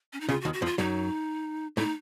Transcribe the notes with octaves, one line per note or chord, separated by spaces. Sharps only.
C#4
D#4
C#2 C#3 F4
F#4
D#2 D#3
F#4
F2 F3
F4
F#2 F#3 D#4
A2 A3 D#4